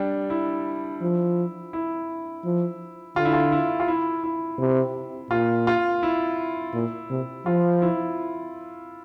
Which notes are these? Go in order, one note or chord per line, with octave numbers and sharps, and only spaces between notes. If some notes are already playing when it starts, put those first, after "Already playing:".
Already playing: G3 D4
E4
F3
E4
F3
D3 F4
E4
F4
E4
F4
E4
E4
C3
A#2 F4
F4
E4
A#2
C3
F3 F4
E4